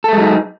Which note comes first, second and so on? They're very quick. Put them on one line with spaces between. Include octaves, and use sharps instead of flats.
A4 A3 G#3 F#3 D#4